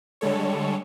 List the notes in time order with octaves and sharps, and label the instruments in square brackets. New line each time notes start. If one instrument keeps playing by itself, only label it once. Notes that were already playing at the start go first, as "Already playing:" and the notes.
[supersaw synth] D3 G3 G#3 A4 C#5